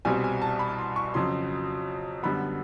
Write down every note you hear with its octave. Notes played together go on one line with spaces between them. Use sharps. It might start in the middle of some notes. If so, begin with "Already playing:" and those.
C2 B2 G3 C4 G#5
G#5
A5
B5
C6
C#6
F2 C#3 F#3 C6
F#2 D3 G3 B3 B5